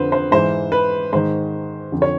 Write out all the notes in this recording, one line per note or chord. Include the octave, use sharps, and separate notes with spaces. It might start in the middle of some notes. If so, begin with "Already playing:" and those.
Already playing: F2 D3 B4 C5
C5
G#2 E3 C5
B4
G#2 D#3 C5
F2 D3
C#5